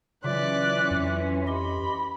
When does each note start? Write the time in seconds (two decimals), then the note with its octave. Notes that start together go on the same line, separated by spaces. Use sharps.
0.24 C#3 E3 F#3 C#4 F4 D5 E5 F#6
0.91 F2
1.47 G4 D#5 B5 C6